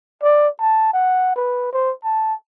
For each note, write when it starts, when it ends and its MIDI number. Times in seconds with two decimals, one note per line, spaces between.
0.23 0.48 74
0.60 0.91 81
0.93 1.35 78
1.36 1.70 71
1.73 1.92 72
2.04 2.34 81